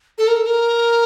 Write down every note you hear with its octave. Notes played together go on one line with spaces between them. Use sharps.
A4
A#4
A4
A#4